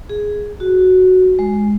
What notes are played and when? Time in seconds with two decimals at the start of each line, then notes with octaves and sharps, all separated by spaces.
0.09 G#4
0.60 F#4
1.39 G#3